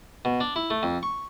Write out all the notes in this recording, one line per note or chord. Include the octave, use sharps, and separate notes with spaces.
B2
D4
E4
A3
F2
C#6